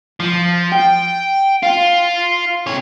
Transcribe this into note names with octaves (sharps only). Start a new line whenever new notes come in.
F3
G5
F4
C3 C#5